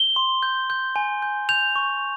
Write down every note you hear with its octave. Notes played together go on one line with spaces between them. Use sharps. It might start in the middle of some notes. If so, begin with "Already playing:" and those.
Already playing: G7
C6
G6
G6
G#5
G6
G6 F7
C#6